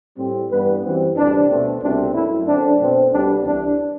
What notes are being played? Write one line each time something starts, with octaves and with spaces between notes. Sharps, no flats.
A2 G3 C4
G2 E3 G3 B3 B4
F#2 E3 G3 C4
D2 C3 E3 G3 D4
B2 A3 C4
C2 B2 A3 C4 D4
F#2 F#3 A3 E4
F#2 D3 A3 C4 D4
B2 A3 C4
D2 C3 G3 B3 D4
C2 C3 E3 D4